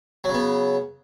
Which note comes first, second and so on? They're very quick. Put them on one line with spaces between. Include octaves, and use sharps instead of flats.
F#3 C#3 B3